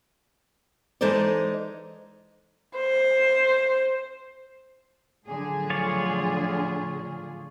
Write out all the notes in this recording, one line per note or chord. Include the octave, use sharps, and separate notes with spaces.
E3 G#3 D#4 A4 C5 D5
C5
A2 D3 F3 F#3 G#4
F4 C#5 D5